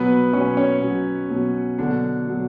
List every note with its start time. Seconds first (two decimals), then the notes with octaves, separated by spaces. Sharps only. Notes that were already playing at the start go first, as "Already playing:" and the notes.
Already playing: B2 F#3 B3 B4
0.33 B2 F#3 C#4 C#5
0.57 C#4 C#5
0.81 B2 F#3
1.30 B2 F#3
1.78 B2 D3 F#3 D4
2.27 B2 F#3